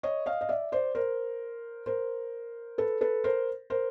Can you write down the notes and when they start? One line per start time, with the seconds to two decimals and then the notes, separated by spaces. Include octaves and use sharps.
0.03 C#5 D#5
0.26 D#5 F5
0.41 D#5
0.49 D5 E5
0.72 C5 D5
0.95 A#4 C5
1.86 A#4 C5
2.78 A4 B4
3.01 A4 B4
3.24 A#4 C5
3.70 A#4 C5